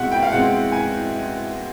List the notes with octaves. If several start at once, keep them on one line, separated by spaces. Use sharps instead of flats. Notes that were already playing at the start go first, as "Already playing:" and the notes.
Already playing: B2 G#3 C4 E5 F#5
G5
F5
B2 G#3 C4 F#5
G#5